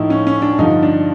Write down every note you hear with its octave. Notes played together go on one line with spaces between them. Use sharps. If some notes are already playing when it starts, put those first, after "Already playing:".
Already playing: A2 F3 D#4 E4
C#4
C#4
D4
G2 D3 F3 D#4
D4